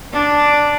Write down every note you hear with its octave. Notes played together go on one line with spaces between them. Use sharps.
D4